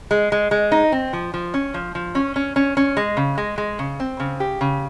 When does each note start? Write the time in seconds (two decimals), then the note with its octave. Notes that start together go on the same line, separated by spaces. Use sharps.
0.11 G#3
0.32 G#3
0.51 G#3
0.72 D#4
0.92 C4
1.13 F3
1.34 F3
1.54 C#4
1.74 F3
1.95 F3
2.15 C#4
2.36 C#4
2.56 C#4
2.77 C#4
2.97 G#3
3.17 C#3
3.38 G#3
3.58 G#3
3.79 C#3
4.00 C4
4.20 C#3
4.40 G4
4.61 C#3